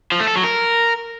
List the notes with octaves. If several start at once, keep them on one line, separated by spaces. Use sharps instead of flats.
F3
A3
A4
F#3
A#4